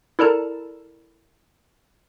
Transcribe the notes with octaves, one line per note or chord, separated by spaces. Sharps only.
E4 A4 A#4 D5 A5 A#5